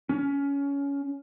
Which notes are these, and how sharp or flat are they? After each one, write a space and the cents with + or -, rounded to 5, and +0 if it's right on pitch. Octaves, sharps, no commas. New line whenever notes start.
C#4 +20